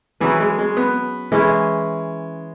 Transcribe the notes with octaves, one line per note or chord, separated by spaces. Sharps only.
E3 F#3 C#4 G#4 B4
G#3
G#3
B3
E3 G#3 C#4 E4